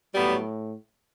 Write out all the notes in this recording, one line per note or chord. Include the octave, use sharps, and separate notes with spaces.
A2 F#3 G3 B3